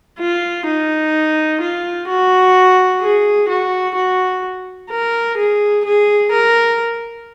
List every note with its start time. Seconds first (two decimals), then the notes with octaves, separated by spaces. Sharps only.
0.18 F4
0.66 D#4
1.61 F4
2.08 F#4
3.02 G#4
3.49 F#4
3.95 F#4
4.91 A#4
5.37 G#4
5.85 G#4
6.32 A#4